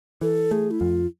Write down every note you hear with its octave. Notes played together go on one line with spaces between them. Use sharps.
E3 A4
A3 G#4
E4
F2 F4